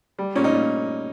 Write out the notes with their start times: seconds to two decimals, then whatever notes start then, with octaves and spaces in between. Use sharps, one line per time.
0.19 G3
0.36 A#2 C#4
0.44 D#4
0.53 A#2